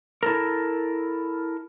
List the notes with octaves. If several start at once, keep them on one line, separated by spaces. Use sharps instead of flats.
E4 A4 A#4